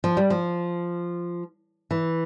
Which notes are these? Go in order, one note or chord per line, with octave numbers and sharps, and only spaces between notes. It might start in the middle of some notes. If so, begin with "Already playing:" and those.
F3
G3
F3
E3